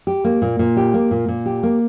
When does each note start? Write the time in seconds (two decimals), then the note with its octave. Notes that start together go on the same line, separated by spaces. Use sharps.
0.07 G4
0.24 A#3
0.42 A#2
0.59 A#2
0.77 G4
0.94 A#3
1.11 A#2
1.28 A#2
1.46 G4
1.63 A#3